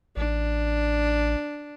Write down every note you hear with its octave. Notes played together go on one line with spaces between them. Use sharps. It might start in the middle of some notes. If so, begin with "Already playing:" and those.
A1 D4